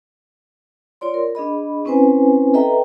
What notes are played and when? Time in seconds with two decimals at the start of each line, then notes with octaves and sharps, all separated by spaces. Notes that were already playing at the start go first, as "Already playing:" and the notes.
1.01 F4 C#5 D5 C6
1.14 A#4
1.35 D4 G#4 D#5 B5
1.85 C4 C#4 E4 B4 C5 G#5
2.54 A4 B4 D#5 E5 G5 A#5